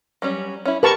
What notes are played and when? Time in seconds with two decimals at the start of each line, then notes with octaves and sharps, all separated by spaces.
0.22 F#3 G3 C#4
0.65 C#4 E4
0.83 G4 A#4 B4 A5 C#6